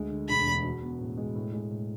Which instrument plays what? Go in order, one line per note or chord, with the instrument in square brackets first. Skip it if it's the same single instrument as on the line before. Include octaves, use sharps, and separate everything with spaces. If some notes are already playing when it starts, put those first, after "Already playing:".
Already playing: [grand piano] D2 G#3
D3
[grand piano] E1 [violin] B5
[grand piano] E2
F#4
B3
A2
G#3
A2
G#3
A2